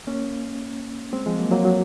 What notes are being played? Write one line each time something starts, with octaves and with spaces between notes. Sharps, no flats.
A#3 C#4
G#3 C4
F3 G#3
F#3 A#3
F#3 A#3
F#3